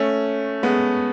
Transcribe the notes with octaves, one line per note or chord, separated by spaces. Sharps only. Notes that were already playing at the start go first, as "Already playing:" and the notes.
Already playing: A3 C#4
G#3 B3